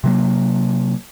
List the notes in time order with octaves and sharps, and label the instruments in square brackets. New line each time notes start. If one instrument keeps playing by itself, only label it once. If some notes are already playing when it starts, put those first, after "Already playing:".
[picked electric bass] C3 F#3 A#3